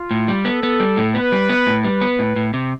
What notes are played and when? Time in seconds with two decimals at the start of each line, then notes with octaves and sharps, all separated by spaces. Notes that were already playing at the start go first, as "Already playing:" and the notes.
Already playing: F4
0.11 A2
0.28 G3
0.45 B3 A4
0.63 B3
0.80 G3
0.97 A2
1.15 B3 B4
1.32 G3
1.50 B3
1.67 A2
1.84 G3 B4
2.01 B3
2.19 A2
2.36 A2
2.54 C3